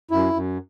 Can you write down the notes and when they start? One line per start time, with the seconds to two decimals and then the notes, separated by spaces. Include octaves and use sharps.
0.11 F#2 E4
0.33 F#2